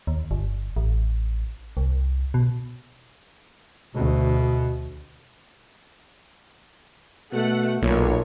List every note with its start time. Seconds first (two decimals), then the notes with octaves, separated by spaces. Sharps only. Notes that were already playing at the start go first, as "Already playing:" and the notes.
0.07 D#2
0.31 G1
0.76 A1
1.77 C2
2.34 B2
3.95 D2 B2
7.32 B2 A3 A4 F#5
7.82 B1 A#2 A#4 C#5